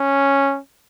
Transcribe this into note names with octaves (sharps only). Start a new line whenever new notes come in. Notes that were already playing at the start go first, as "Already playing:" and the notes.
Already playing: C#4